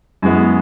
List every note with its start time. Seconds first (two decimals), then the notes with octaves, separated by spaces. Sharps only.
0.22 F#2 E3 G#3 B3